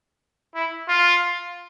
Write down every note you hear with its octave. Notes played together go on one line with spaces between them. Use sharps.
E4
F4